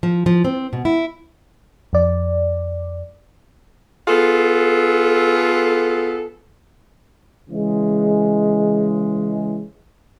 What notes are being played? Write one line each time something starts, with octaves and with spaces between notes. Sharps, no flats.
F3
F3
C4
B2
E4
F2 D5
B3 F4 G#4 A4
C#3 E3 G#3